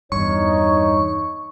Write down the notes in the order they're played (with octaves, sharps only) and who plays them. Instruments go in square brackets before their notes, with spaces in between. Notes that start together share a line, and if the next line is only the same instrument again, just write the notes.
[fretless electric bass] E2 G2 [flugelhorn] D#4 [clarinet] C#5 [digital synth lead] C#6